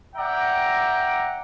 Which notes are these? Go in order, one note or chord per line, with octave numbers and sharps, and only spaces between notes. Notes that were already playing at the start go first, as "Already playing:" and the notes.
D5 E5 F#5 G5 A#5